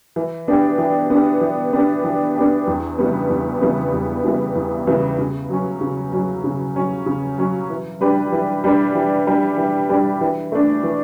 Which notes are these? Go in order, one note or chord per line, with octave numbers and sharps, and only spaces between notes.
E3
B3 D4 G4
E3
B3 D4 G4
E3
B3 D4 G4
E3
B3 D4 G4
E2
C#3 E3 G3 B3
E2
C#3 E3 G3 B3
E2
C#3 E3 G3 B3
E2
C#3 E3 G3 B3
C#3
F#3 C#4
C#3
F#3 C#4
C#3
F#3 C#4
C#3
F#3 C#4
E3
G3 D4 G4 B4
E3
G3 D4 G4 B4
E3
G3 D4 G4 B4
E3
G3 D4 G4 B4
E3
A3 D4
E3